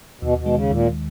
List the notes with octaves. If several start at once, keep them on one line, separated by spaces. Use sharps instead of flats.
D#2 B2
B2
D#3 G#3
C#3
D#2 A#2